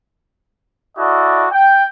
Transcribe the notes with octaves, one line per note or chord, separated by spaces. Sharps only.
E4 F#4 A4 D5 D#5
G5